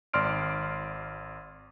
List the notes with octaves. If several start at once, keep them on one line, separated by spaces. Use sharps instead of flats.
G#1 D5 C6 F6 D7